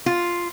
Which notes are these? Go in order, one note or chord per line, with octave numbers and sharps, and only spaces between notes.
F4